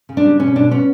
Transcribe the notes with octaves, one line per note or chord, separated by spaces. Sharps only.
C#3
D4
G3
B2 C#4
B2 D4
B3 C#4